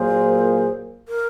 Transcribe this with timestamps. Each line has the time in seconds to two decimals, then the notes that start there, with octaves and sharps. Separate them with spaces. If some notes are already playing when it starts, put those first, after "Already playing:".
Already playing: A#2 F#3 A#3 F4 G#4 C5
1.08 A#4